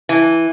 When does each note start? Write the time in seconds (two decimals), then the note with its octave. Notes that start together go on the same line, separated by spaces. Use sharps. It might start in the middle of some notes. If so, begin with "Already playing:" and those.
0.09 E3